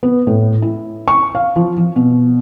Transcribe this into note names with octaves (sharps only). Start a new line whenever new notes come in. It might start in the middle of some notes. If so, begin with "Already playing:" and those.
B3
A2
E4
C#6
F5
F3
F3
B2